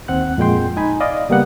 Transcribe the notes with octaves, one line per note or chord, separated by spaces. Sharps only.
D#2 C4 F#5 F#6
F2 A#2 G#3 G5 C6
D#4 G#5 B5
D5 D#5 F5
C#3 G3 A#3 B3 F#5